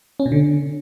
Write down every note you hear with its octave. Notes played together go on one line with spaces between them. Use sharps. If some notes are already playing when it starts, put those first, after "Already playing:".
C#4
B2
D3